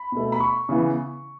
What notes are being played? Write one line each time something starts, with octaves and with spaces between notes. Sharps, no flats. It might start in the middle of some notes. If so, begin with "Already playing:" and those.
Already playing: B5
B2 A3
B5
C#6
C#3 E3 B3